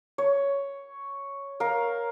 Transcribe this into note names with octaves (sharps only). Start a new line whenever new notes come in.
C#5
A#4 F5